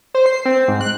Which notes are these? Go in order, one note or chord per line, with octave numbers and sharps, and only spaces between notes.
C5
C7
C4
G#2
F#6